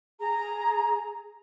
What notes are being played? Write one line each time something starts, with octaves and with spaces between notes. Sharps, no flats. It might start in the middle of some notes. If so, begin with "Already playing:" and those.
G#4 A#5